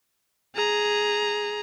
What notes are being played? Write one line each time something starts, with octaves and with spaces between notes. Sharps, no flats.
G#4 A#5